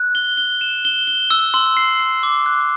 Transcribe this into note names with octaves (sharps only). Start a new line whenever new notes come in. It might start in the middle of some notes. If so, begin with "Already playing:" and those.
Already playing: F#6
G7
G7
E7
G7
G7
E6
C6
C7
C7
D6
F#6